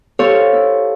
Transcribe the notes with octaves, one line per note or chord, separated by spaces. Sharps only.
G4 A4 C5 C#5 F5
E4